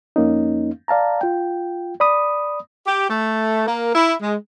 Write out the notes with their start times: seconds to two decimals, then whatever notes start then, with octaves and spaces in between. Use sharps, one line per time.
0.16 F2 A#3 C#4 D#4
0.88 D5 F5 A5 A#5
1.21 F4 G5
2.00 D5 B5 D#6
2.87 G4
3.10 A3
3.67 A#3
3.95 E4
4.22 G#3